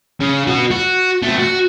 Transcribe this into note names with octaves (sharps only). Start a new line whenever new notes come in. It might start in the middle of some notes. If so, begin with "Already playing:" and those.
C#3
B3 F#4
F#4
A3 C4
F#4